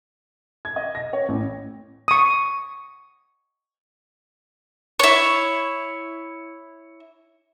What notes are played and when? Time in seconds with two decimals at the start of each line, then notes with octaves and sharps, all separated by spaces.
0.65 G#6
0.76 D#5
0.95 A#6
1.13 C#5
1.29 A1
2.08 C#6 D#6
4.99 E4 C#5